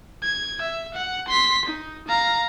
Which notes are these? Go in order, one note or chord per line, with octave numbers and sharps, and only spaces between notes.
G#6
E5
F#5
C6 B6
D#4
F5 A#5